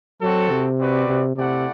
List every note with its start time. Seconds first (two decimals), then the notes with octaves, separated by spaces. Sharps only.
0.21 F#3 C4 F#4 A4
0.50 C3
0.78 C4 F#4 B4 D5
1.08 C3
1.36 C3 A3 E4 G4 D5 F#5